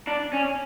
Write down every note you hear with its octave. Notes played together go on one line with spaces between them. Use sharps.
D4
C#4